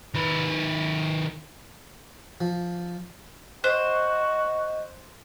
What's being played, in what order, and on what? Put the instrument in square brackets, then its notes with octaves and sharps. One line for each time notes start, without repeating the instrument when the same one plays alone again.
[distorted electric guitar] D#3 B4
[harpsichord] F3
[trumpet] F#4 [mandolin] C5 [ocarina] D#5 [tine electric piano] F#6